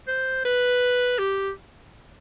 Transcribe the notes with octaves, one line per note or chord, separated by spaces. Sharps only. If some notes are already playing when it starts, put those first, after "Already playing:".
C5
B4
G4